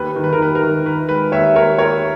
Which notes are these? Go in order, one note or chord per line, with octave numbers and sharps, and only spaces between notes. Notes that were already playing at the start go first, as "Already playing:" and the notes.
Already playing: D#2 B4
D#3
B4
A#4
D#2 B4
A#4
D#3
D#3 B4
G#3 B4
D#2 C#5 E5
D#2 A#4 C#5
D#2 A#4 C#5